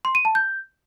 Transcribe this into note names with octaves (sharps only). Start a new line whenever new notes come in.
C6
D#7
A5
G6